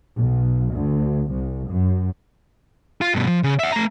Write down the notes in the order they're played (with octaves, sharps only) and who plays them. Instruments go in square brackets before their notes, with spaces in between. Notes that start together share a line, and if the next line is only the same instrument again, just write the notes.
[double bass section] B1
D2
C2
F#2
[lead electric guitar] F4
G2 B2
F3
C#3
E5 F#5
A3 A#5